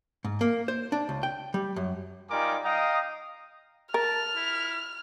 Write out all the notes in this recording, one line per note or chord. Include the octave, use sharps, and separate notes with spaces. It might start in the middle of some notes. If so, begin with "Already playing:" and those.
G#2
A#3
C5
D4
C#2
G5
G3
F#2
G3 D#4 F4 A#4 G#5 D6
D#5 F5 G5 A#5 D#6
A#4 A5 F6
E4